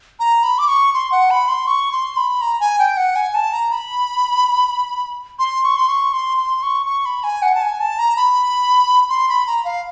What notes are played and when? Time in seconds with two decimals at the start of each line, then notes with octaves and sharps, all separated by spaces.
0.20 A#5
0.43 B5
0.58 D6
0.68 C#6
0.94 C6
1.12 F#5
1.31 B5
1.48 C6
1.67 C#6
1.92 C6
2.17 B5
2.42 A#5
2.60 G#5
2.79 G5
2.97 F#5
3.16 G#5
3.35 A5
3.53 A#5
3.72 B5
5.39 C6
5.64 C#6
5.77 C6
5.89 C#6
6.13 C6
6.38 C6
6.63 C#6
6.86 C#6
7.06 B5
7.24 G#5
7.42 F#5
7.55 A5
7.62 G#5
7.80 A5
7.99 A#5
8.17 B5
9.09 C6
9.29 B5
9.47 A#5
9.65 F5